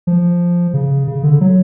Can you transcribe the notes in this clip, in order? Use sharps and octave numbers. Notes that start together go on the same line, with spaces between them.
F3
C#3
C#3
D3
F#3